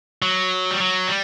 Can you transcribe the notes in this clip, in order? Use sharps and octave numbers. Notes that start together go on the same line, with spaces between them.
F#3
G3
F#3
G3